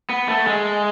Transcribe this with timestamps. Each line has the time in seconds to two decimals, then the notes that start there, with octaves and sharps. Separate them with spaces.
0.10 B3
0.28 A3
0.47 G#3